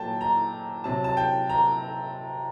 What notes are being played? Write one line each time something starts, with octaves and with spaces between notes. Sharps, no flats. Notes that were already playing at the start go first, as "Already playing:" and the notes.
Already playing: A#2 F#3 G5 A5
A#5
C3 F#3 A5
A5
G5
A#5